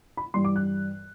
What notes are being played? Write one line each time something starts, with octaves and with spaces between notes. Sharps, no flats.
B5
G2 E3 G3 C6
D6
F#6